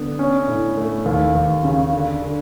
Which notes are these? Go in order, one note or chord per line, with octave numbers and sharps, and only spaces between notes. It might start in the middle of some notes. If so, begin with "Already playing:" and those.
Already playing: D3 B3
C#4
A2
A3
D#2
D#2
C#3
D3
D3